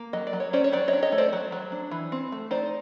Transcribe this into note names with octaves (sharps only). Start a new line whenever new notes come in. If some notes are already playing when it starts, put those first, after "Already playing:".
Already playing: A#3
F#3 D#5
D5
F#3
C#5
C#4 C5 D5
C#5
F#3 C5 D5
C#5 D#5
D4
C#5 D#5
A3
C5 D5
F#3
F#3
D4
E3
C4
A3
D#4 C5 D5